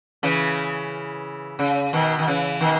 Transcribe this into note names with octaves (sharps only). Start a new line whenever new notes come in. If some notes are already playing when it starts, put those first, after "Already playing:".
C#3 E3
C#3
B2 D#3
D#3
C#3 E3
B2 D#3